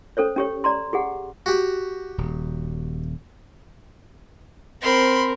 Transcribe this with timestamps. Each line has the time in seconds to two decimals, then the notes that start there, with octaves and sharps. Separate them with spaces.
0.17 C#4 A4 C5 C#5
0.36 C#4 G4 C#5
0.64 D5 A#5 C6
0.93 G4 G#4 F#5
1.46 F#4 G4
2.18 D#1
4.82 C4 A#4 B5 C6